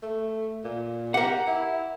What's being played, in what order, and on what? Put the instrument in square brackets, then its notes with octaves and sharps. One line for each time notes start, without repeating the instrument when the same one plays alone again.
[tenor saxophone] A3
A#2
[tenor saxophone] G4 [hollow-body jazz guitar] A#4 F#5
[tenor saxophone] E4